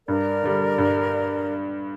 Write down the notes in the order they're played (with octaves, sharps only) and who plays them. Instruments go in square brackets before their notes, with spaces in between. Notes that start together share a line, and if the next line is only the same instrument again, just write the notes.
[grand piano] G2 [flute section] A#4 D5
[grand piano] D3 G3
G2